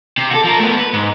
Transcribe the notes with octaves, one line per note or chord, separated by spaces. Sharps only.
C3
F#4 A4
F3 A#4
A3 B3
B4
G#2